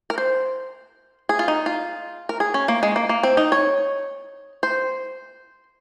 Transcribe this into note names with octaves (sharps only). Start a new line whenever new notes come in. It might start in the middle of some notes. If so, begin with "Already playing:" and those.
A#4
C5
G#4
F4
D#4
F4
A#4
G#4
C#4
A#3
G#3
A#3
A#3
C4
D#4
C#5
C5